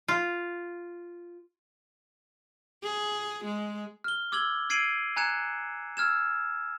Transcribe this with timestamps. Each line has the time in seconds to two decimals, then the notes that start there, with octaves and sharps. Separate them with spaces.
0.08 F4
2.83 G#4
3.45 G#3
4.04 F6 G7
4.32 D6 E6 G#6 F#7 G7
4.70 E6 G#6 C7 D7 D#7 F#7
5.16 G#5 A#5 F#6 G#6 C#7 E7
5.97 E6 F6 G#6 E7